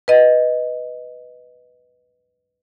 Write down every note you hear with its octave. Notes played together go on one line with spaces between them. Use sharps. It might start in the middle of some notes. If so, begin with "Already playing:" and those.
B4 D#5